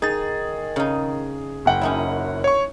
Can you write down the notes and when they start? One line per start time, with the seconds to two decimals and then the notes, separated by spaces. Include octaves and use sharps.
0.02 D#3 D#4 G#4 A6
0.76 C#3 D#4
1.65 F#1 F#5 G5
1.81 F#2 C#4 D#4 E4
2.44 C#5 C#6